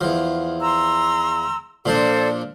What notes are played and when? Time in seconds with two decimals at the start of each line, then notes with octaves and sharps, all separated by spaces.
0.01 E2 F3
0.61 A#5 C6 E6
1.85 A#2 F3 D4 A4 C5